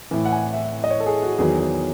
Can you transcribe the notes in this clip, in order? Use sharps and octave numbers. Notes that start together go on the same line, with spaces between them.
A2 E3
F#5
G#5
E5
D#5
C#5
A4
G#4
F#4
E2 D#3 F#3 G#4
G#4